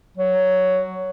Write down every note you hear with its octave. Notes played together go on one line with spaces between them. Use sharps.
F#3